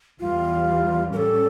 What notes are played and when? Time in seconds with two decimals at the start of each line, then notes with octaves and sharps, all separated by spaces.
0.20 E2 E3 G3 F4
1.12 A2 G3 C#4 A4 A#4